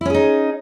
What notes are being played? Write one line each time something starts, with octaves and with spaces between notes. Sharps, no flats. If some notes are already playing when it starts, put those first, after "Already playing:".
C#4 D#4 E4 G#4